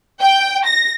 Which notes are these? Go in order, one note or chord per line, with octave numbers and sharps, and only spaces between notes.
G5
A#6